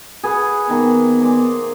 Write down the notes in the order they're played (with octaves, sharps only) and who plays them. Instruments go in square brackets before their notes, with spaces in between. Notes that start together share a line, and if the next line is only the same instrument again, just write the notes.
[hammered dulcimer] G#4 B4 F#5
[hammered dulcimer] D#3 A#3 [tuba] B3
[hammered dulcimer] C5 D5 G#5